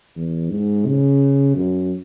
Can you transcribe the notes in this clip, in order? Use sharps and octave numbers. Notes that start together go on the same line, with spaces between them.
E2
G#2
C#3
F#2